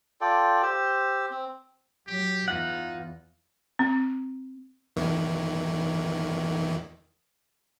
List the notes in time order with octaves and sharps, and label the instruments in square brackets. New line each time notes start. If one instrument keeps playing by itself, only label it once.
[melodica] F4 A4 D5 G5
G4 C5 E6
C4
[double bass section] F#3 [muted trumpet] G4
[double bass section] E2 E3 [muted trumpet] D#4 [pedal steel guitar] F4 F#5
[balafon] C4
[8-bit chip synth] E2 D#3 E3